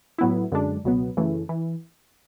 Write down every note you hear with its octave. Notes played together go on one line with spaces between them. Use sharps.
A2 F#3 B3 E4
F#2 D3 G#3 D4
C#2 B2 F#3 B3
F#2 C#3 E3 A3
E3